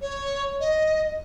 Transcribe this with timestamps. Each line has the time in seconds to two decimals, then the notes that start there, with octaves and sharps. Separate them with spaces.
0.01 C#5
0.60 D#5